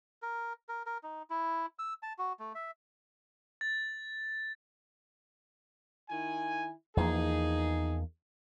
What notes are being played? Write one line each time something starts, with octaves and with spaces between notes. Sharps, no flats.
A#4
A#4
A#4
D#4
E4
E6
A5
F#4
A3
E5
A6
D#3 E4 G#5
E2 F3 A#3 D#4 G#4